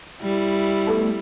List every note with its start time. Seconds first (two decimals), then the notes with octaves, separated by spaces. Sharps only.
0.22 G3 E4
0.87 A3 B3 A4